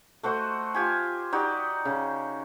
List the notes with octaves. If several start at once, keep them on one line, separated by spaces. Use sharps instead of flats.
A3 F#4 C5 D#5
F4 G4 G#5
D#4 F#4 G4 D5
C#3